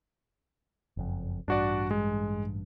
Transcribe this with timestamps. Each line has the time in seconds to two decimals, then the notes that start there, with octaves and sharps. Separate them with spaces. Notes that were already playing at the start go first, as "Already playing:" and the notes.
0.97 F#1 F2
1.48 A1 G2 D4 F#4 D5
1.91 G#3